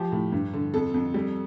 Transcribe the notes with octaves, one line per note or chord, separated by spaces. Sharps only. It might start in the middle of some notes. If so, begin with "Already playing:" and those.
Already playing: F3 G4
A2
G2
D3
F2 A4
F2
G3